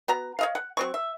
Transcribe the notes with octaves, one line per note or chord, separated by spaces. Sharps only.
B3 F#4 A#5
C#5 D#5 F5
F#5
F#3 C4 C#6
E5